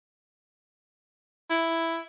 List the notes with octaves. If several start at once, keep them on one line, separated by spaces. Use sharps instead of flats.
E4